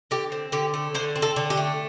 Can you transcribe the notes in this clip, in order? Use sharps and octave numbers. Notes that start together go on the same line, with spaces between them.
D3 G4
C4
D3 G4
A3
D3 C5
C4
A4
D3
G4
A3